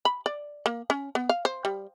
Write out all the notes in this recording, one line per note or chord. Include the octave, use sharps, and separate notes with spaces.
B5
D5
A#3
C#4
B3
F5
C5
G3